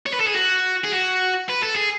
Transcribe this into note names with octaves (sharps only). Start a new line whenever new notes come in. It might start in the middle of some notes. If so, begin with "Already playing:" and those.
C#5
B4
A4
G#4
F#4
G#4
F#4
B4
A4
G#4